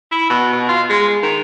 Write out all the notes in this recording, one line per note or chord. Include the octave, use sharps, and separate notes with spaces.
E4
B2
B2
F4
G#3
D#3